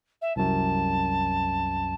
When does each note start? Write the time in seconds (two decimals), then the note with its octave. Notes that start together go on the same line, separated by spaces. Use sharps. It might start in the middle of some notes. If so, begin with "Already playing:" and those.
0.21 E5
0.36 C2 F#2 A5